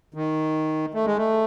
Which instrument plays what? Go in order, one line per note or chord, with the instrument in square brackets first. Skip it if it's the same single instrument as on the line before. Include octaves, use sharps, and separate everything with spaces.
[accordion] D#3
A3
G#3
A3